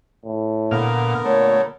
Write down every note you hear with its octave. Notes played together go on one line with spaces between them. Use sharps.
A2
A#2 D3 B3 A#4 F5
A#2 A3 C#5